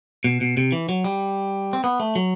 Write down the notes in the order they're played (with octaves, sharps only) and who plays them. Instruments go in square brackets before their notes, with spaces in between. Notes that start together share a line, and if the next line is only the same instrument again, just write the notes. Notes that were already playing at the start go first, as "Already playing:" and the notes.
[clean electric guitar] B2
B2
C3
E3
F#3
G3
C4
B3
A3
F#3